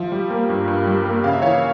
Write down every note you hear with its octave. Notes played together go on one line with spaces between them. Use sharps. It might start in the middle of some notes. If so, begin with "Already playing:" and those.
Already playing: F3 E5
G3
A#3
G2
G2
G3
A#3
C#3 F5
E5
E3 C#5 F5